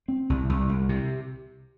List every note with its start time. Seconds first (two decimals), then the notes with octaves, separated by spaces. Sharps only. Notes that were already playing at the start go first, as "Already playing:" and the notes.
0.08 C4
0.30 C2
0.49 C2
0.69 C2
0.89 C3